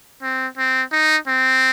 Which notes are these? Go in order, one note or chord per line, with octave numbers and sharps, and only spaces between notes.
C4
C4
D#4
C4